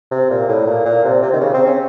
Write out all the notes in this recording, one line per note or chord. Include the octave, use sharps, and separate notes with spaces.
C3
A#2
A2
A#2
A#2
C3
C3
D#3
C#3
C4
C#4